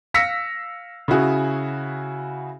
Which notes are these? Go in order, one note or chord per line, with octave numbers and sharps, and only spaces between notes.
F5 E6 A#6 B6 C#7
C#3 E4 F#4 G#4